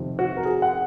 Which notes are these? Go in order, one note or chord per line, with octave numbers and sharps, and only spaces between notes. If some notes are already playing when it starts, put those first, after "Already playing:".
Already playing: F2 C3 D#3
F#4
A#4
G#4
F#5